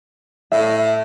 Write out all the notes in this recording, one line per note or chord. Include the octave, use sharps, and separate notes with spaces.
A2 E5